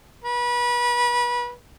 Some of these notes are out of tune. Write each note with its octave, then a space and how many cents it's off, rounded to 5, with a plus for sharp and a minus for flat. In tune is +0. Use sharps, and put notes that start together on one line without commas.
B4 -30